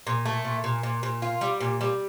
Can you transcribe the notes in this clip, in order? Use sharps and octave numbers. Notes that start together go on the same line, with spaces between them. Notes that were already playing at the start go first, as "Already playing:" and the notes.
A#2
A3
A#2
A#2
A#2
A#2
F4
G3
A#2
G3